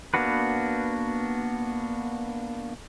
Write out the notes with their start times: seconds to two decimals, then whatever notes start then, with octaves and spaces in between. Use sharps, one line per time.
0.14 A#3 B3 D4 F#4 B4